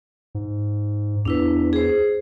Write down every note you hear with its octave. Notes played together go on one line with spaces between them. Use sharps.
G#2
E2 D4 E4 B4
G#4 C5